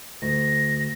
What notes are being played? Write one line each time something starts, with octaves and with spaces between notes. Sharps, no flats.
D2 A#6